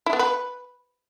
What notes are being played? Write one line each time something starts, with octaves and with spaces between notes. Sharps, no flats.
E4
B3
B4